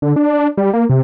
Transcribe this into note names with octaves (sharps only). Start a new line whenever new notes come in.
D3
D4
G3
A#3
C3